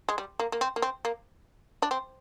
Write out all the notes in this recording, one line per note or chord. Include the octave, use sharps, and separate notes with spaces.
G#3
G3
A#3
A#3
C4
A#3
C4
A#3
D4
C4